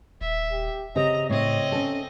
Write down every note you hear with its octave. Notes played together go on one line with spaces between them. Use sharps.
D#1 E5
G4
C#3 C4 G4 C#5 D#5 A#5
A2 C4 C#5 D#5
C#4 A4